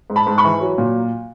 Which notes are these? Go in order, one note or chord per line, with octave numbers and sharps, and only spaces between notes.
G#2
A5 B5
G#2
B5 C#6
E3
F#3
A#2